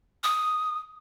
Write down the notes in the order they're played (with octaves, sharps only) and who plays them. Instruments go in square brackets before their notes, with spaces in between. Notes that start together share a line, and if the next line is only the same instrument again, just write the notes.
[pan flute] D#6